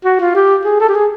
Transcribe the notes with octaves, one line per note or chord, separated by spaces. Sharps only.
F#4
F4
G4
G#4
A4
G4
G#4